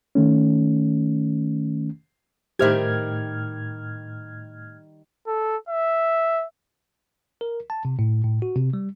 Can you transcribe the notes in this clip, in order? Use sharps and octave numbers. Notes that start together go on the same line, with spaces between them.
D#3 A3 C#4
A2 D#3 G3 G4 C5 E5 F6 G#6
A4
E5
A#4
A5
C3
A2
A2
F#4
C3
G3